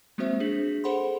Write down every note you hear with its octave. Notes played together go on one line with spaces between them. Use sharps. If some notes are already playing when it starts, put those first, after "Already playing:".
G#3 A#3 C4 F#4 C5 E5
D4 G#4 B6 F#7
G#4 A4 C5 F#5 B5 C6